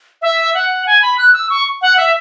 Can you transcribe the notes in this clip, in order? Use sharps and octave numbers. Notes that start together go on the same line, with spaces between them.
E5
F#5
G#5
B5
F#6
E6
C#6
F#5
E5